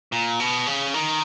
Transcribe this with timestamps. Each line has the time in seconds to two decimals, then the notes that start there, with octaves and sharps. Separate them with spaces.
0.12 A#2
0.40 B2
0.67 C#3
0.94 D#3